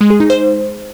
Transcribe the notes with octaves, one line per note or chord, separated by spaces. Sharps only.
G#3
G#4
D#4
C5